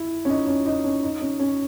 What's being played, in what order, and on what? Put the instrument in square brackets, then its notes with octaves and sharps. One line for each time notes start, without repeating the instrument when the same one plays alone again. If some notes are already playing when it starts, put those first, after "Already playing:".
Already playing: [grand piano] E4
C#4
D#4
C#4
D#4
C#4
D#4
C#4
C#4